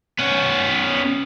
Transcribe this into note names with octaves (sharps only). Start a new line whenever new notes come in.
B3 C#4